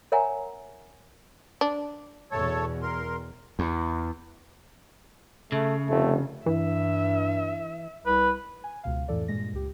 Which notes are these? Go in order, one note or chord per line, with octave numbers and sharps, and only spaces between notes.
A#4 C#5 E5 F#5 G#5 A#5
D4
E2 B2 A3 A4 C#5
A#4 C6
E2
C#3 A3
F1 A3
G2 E3 E5
C2 B4
G#5
C#2 B2 F5
F2 A2 E3 A4 D5
G2 A#2 G#3 A#6
C#2 G4